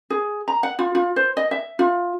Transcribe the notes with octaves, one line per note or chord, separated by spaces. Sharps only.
G#4
A#5
F#5
F4
F4
C5
D#5
E5
F4